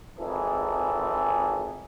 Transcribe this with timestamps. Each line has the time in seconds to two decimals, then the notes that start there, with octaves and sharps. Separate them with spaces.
0.18 G#1 F2 E3 G#4 A4